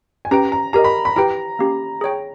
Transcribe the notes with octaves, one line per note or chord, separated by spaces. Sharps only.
G#5
C#4 G4 B4 G5 A#5
A#5
G4 A#4 D#5 A#5
B5
B5
E4 G4 B4 G5 A#5
A#3 C#4 G4
G#4 C#5 G5